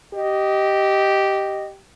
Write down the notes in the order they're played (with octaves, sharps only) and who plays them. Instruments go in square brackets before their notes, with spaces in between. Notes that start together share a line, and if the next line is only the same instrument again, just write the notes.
[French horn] G4 [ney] D#5